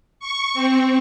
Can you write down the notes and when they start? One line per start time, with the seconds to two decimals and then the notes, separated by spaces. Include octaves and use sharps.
0.20 C#6
0.54 C4